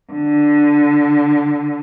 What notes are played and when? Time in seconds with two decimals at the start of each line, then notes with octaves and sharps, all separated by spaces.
0.12 D3